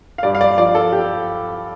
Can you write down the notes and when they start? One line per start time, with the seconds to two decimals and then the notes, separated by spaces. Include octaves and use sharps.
0.18 F5
0.23 G2 D5
0.35 F5
0.41 D5
0.57 F3 D5
0.75 A4
0.92 G4